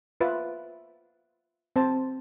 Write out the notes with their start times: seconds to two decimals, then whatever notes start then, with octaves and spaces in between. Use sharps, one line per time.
0.21 F4 B4 E5
1.76 C4 C5 A5